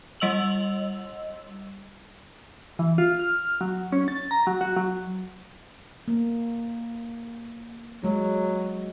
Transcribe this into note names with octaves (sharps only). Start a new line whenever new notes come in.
G3 D#5 E6 F7 F#7
E3
F4
F6
F#3
C#4
A6
A#5
F#3
F#4
F#3
A#3
F#3 G#3 F#4